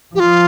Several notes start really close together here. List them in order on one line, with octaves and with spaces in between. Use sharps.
F3 G4 F4